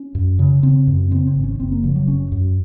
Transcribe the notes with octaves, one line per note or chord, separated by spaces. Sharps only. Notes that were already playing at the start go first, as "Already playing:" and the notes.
Already playing: C#4
F#2
C#3
C#3 C4
F#2
C#3 C4
C4
G#1
C#4
F#1 C4
A#3
C#3 F3
F#3
F#1 C#4
F#2